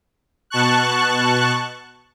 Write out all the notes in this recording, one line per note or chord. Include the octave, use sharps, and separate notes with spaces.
B2 A5 C#6 F#6